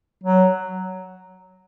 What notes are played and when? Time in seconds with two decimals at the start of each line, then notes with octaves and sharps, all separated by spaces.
0.24 F#3